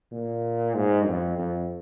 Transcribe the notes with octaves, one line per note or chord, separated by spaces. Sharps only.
A#2
G#2
F2
F2